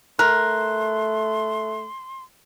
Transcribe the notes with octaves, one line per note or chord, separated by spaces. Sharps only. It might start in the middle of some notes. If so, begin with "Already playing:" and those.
A3 A#4 C6 F#6